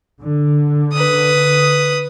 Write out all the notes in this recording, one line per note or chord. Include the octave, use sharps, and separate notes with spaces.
D3
B4 D#6